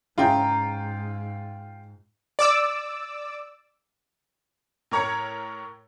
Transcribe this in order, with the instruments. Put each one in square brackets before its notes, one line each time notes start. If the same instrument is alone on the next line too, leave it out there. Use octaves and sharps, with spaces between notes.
[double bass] G#2 [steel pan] C#4 E4 G#4 [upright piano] F4 G5 [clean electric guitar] A#5
[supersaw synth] D5 D6 E6
[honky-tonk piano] A2 A#4 C#5 A#5 G#6 C#7